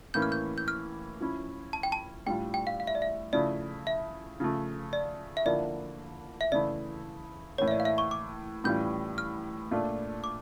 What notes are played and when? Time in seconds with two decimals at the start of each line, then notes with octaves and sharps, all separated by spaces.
0.14 A2 E3 A#3 C#4 E4 G6
0.22 F6
0.32 G6
0.58 G6
0.68 F6
1.20 F3 C#4 E4
1.73 A5
1.83 G5
1.92 A5
2.26 A2 G3 D4 F4 G5
2.54 G5
2.67 F5
2.80 F5
2.87 E5
2.95 D5
3.02 E5
3.33 C#3 F3 A3 E4 D5
3.87 E5
4.40 C#3 F3 A3
4.93 D5
5.37 E5
5.45 D3 F3 A#3 E4 D5
6.41 E5
6.52 C#3 E3 A3 E4 D5
7.58 A2 E3 A#3 C#5
7.68 E5
7.71 D5
7.80 F5
7.85 E5
7.98 C#6
8.11 D6
8.64 A2 E3 G3 C#4 F4 G6
9.18 F6
9.71 A#2 A3 D4 F4
10.24 D6